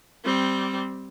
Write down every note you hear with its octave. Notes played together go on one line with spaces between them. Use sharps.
G3 C4